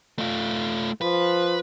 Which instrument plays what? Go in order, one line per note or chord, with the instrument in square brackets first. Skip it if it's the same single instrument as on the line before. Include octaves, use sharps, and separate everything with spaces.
[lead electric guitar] A3 F4
[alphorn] F3 [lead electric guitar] B4